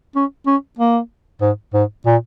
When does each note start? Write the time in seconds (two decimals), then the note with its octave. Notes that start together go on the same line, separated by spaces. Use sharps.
0.16 C#4
0.47 C#4
0.79 A#3
1.42 G#2
1.74 G#2
2.06 A#2